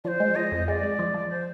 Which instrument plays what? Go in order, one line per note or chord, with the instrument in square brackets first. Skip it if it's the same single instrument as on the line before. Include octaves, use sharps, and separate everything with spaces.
[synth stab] F3 [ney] C5 D5
[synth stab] G#3
[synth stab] F3 [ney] D#5
[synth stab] F2
[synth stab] G#3 [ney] D5
[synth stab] G#3
F3
F3
[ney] C5